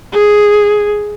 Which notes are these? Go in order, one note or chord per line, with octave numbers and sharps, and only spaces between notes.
G#4